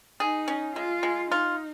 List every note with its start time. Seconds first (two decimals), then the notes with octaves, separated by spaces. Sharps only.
0.20 D#4 G#4
0.48 C#4
0.75 G#3 F4
1.03 G#3
1.31 D#4 F4